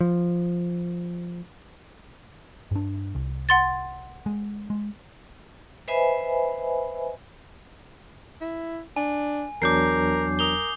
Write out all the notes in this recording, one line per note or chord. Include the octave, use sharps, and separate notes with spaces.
F3
G2 D4
C2
F#5 C6 A6
G#3
G#3
B4 C5 D#5 E5 G#5 B5
E4
D4 G#5
E2 F#3 D4 A#4 D6 G6 C7
A#4 D#6 F7 G7